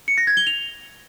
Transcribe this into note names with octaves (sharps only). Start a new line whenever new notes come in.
C#7
A#6
G#6
G7
F7